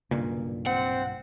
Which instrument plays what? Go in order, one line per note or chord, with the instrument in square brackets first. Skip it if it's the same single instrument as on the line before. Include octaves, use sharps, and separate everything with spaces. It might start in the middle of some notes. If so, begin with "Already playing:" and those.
[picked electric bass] B1 G2 A#2 [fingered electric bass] C#3 A#3
[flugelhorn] C4 [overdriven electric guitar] F#5